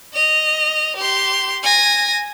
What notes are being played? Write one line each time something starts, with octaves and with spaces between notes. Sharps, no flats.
D#5 F7
G4 C6
G#5 A#6